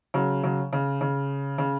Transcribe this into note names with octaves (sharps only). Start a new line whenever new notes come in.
C#3 F#3
C#3 F#3
C#3
C#3
C#3